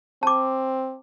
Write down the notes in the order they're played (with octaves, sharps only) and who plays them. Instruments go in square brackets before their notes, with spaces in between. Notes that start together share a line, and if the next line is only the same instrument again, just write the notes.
[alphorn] C4 [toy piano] A5 D6